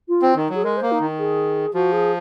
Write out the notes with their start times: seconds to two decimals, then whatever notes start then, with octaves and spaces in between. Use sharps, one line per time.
0.08 F4
0.22 C4
0.36 D#3 D#4
0.50 F#3
0.55 G#4
0.64 G#3 A#4
0.77 C5
0.82 A#3
0.91 D#4
1.00 D#3
1.19 G#4
1.74 F3 F#4
1.92 G#4